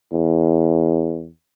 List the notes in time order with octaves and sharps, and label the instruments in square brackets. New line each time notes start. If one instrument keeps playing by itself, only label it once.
[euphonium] E2